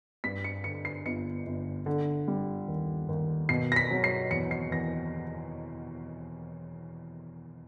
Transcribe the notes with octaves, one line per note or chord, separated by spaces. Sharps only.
G2 B6
C#7
D3 C#7
C7
G1 C#7
G1
D3
G3
D#2
D#2
B2 C7
A#6
B6
F#3
C7
E2 C#7
C7
E2 A#6